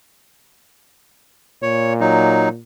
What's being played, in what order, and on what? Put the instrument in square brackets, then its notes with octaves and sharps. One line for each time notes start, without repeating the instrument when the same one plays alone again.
[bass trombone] A#2 [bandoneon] C#5
[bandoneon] F#3 D#4